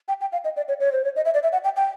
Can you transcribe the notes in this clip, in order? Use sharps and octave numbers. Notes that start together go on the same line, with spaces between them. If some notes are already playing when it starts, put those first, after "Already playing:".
G5
G5
F5
D#5
D5
C#5
C#5
C5
C#5
D#5
E5
D5
E5
F#5
G5
G5